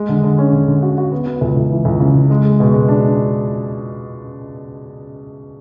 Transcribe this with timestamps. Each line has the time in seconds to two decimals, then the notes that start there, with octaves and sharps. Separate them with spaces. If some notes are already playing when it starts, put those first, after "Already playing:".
Already playing: G#3
0.09 D3
0.23 D3
0.38 C#4
0.52 D3
0.68 D3
0.82 F#4
0.98 F#4
1.12 B3
1.26 B3
1.41 C#2
1.57 C#2
1.70 E3
1.85 C#2
2.00 C#3
2.16 C#3
2.30 G#3
2.45 G#3
2.60 B2
2.74 G#3
2.88 D4